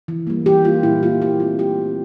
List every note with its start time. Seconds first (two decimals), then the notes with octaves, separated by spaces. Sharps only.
0.08 E3
0.27 G3 A#3
0.46 E3 G4
0.65 G3 A#3 F4
0.83 A#2 E4
1.02 G3 A#3 F4
1.21 A#2 G4
1.40 A3 C4 F4
1.59 A#2 G4
1.78 A3 C4